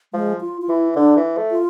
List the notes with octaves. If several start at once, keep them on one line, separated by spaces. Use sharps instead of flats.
F3 G#3
F4
F4
E3 E4
D3 D4
E3
A3
F4